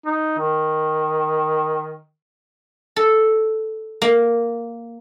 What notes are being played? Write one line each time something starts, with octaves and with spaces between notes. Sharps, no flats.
D#4
D#3
A4
A#3